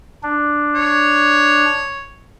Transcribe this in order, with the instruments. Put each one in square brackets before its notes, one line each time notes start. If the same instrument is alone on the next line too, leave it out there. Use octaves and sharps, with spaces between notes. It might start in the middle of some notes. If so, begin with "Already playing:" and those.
[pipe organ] D4
[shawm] C#5